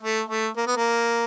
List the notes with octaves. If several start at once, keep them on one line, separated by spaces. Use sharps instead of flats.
A3
A3
A#3
B3
A#3